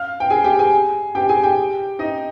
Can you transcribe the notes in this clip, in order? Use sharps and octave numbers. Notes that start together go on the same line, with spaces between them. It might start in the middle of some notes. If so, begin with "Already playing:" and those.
Already playing: F5 F6
G5
G#4 G#5
G4 G5
G#4 G#5
G4 G5
G#4 G#5
G4 G5
D#4 D#5